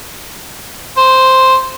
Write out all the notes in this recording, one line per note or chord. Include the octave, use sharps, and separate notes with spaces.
C5